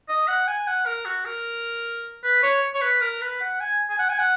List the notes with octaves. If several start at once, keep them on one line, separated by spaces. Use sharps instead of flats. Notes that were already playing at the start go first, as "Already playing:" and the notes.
D#5
F#5
G#5
F#5
A#4
F#4
A#4
B4
C#5
C#5
B4
A#4
B4
F#5
G#5
G#5
F#5
G#5
F#5